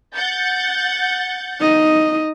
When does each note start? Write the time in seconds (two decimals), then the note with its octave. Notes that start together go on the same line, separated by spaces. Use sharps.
0.15 F#5 G6 A6
1.60 D#4 D#5